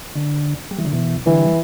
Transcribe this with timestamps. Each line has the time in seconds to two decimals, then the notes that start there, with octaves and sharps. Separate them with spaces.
0.15 D3
0.71 G3
0.79 E3
0.85 D3
0.93 B2 E3
1.26 D3 E3 G3